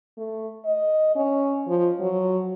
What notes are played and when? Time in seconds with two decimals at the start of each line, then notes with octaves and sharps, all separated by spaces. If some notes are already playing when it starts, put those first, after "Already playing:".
0.17 A3
0.65 D#5
1.15 C#4
1.67 F3
2.00 F#3